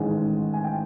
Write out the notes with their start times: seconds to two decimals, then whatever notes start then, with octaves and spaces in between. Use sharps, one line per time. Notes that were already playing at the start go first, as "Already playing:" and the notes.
Already playing: A1 G#2 D#3 G#3 G#5
0.53 G#5
0.64 G5